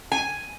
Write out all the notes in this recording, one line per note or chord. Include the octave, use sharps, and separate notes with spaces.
G#5